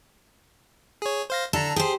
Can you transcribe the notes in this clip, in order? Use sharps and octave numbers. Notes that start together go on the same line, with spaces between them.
G#4 C#5
C5 F5 A#6
D3 D4 A4 A#5
G4 G#4 C5